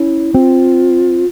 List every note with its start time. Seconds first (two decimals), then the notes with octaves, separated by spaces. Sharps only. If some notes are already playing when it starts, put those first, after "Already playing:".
Already playing: C#4 E4
0.34 C4 F4 F#4